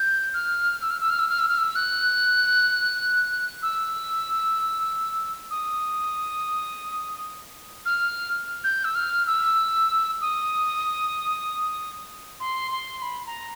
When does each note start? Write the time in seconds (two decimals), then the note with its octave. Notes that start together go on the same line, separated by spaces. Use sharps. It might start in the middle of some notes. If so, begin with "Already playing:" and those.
Already playing: G6
0.34 F6
0.81 E6
0.90 F6
1.00 E6
1.10 F6
1.19 E6
1.29 F6
1.39 E6
1.49 F6
1.58 E6
1.75 F#6
3.62 E6
5.50 D#6
7.86 F6
8.64 G6
8.84 E6
8.95 F6
9.27 E6
10.21 D#6
12.40 C6
12.71 C6
13.02 B5
13.26 A#5